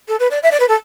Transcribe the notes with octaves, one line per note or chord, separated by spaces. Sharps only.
A4
B4
D5
E5
D5
B4
A4